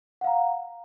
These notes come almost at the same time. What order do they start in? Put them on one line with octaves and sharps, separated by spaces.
F#5 F5 A#5